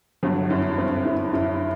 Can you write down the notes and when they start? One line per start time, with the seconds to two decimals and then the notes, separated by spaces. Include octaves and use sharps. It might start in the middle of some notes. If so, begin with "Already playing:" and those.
0.23 G1 G2 F#3
0.50 F#2 E4
0.78 G1 G2 C4
1.05 F#2 E4
1.33 F#2 E4